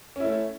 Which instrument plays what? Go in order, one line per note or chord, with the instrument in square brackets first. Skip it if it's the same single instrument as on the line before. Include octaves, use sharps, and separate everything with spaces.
[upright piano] C#4
E4
A3